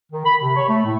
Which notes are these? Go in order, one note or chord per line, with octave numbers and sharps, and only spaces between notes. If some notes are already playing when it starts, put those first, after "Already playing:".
D#3
B5
C3
C#5
A3
A2